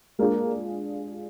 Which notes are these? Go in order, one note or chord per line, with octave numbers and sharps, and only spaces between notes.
G#3 A#3 D4 F4 G#4